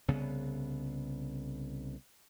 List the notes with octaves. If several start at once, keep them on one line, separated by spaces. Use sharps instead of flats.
C2 C#3 B3